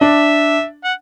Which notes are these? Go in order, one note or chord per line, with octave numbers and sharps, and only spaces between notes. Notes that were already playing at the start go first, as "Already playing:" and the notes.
D4 E5
F#5